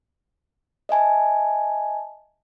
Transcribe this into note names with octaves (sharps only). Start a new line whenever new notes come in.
D#5 E5 G#5 A5